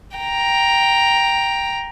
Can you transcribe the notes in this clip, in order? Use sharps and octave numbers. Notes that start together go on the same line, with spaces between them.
G5 A#5